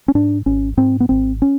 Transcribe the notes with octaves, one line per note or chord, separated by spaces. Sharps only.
C#4
G#2 D4
G#1 C#4
G#2 C4
B3
G#1 C4
C#4